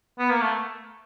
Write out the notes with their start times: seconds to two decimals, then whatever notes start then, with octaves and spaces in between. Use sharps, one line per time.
0.19 B3
0.30 A#3
0.41 A3